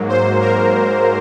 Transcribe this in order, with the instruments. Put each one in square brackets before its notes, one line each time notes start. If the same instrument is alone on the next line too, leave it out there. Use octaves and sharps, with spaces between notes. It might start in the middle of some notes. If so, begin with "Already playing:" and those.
Already playing: [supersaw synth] G#2 F#3 A#3
C5
A#4